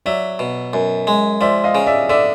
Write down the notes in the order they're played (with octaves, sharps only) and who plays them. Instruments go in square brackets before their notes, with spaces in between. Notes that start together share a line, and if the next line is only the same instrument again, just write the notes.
[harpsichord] F#3 [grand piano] D5 E5
[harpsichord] B2
F#2
G#3
[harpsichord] F3 [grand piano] D5 E5
[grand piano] D#5 F5
[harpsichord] C#3
[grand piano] D5 E5
[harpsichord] D3 [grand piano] D5 E5